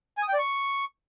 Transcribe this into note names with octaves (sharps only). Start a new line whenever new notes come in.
G#5
D#6
G5
D5
C#6